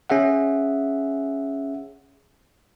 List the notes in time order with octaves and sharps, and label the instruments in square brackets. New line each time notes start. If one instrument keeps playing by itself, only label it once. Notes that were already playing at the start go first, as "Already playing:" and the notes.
[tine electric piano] C#4 G#4 E5 F#5